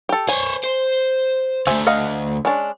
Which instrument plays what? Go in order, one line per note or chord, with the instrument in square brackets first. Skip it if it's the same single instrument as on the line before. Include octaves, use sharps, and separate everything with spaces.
[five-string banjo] G4 A4
[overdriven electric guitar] C5 C#5 [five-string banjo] G#5
[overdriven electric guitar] C5
[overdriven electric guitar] D2 A3 [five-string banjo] C5 E5 G#5
[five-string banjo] D#5 F5 F#5
G#3 C#4 D4